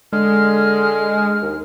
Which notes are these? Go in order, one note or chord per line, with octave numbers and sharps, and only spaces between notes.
D3 G#3 F6
D#2